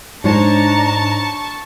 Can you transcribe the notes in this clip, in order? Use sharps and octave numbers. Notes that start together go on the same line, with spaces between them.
G#2 D4 D#4 C5 C#5 A5 A#5 C#6